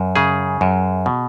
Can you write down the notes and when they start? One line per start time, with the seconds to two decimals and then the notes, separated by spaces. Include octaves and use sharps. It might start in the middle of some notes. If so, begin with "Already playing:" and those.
Already playing: F#2
0.16 C#3 G#4
0.61 F#2
1.06 B2